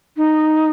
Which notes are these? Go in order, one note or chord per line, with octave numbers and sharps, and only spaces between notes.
D#4